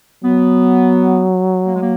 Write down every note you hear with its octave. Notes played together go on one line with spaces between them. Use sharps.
F#3 B3
A#3
G#3
A#3